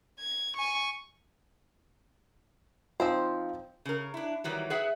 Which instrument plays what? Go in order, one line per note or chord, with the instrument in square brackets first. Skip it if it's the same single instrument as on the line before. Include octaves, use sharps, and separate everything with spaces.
[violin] G#6
G#5 C#6
[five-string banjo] F3 C4 C5 [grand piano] D#4 F4
[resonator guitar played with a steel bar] C#3 A#4
D4 E4
D#3 E3 F#3 G3
G#4 B4 E5 F#5